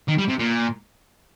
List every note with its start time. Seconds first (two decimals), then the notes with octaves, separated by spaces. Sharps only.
0.08 D#3
0.18 G3
0.29 C3
0.39 A#2